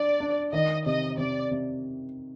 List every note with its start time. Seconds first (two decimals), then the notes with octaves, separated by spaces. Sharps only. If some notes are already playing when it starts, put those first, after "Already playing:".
Already playing: D4 D5
0.20 D4
0.53 D#3 D#5
0.86 C3 D#5
1.18 C3 D5
1.51 C3